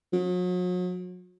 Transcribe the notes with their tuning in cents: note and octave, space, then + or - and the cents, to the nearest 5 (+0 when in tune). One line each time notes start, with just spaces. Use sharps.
F#3 -40